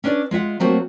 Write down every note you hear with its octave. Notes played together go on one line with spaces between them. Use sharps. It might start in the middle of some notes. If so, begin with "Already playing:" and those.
C#4 D4 B4 C5 D5
G#3 F4 E5 F#5
F#3 A3 A#3 C4 F#4 C5